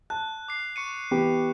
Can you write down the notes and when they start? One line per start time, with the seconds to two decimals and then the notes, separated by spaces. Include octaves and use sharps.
0.10 A5 F#6
0.48 D6 C7
0.76 C#6 C#7 D#7
1.11 E3 B3 G4